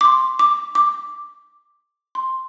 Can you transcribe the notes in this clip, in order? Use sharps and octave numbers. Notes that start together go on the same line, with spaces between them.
D6
C6
D6
D6
C6